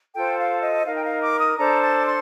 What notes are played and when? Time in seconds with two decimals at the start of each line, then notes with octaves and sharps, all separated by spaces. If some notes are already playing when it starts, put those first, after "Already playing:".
0.14 F4 A4 C5 G5
0.38 F5
0.62 D#5
0.86 D#4 A#4 F5
0.96 G5
1.04 F5
1.22 D6
1.40 D#6
1.58 D4 A4 C5 A#5
1.82 A5
2.06 C6